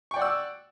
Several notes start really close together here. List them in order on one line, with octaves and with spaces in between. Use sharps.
C#6 G5 D5 F#5 E6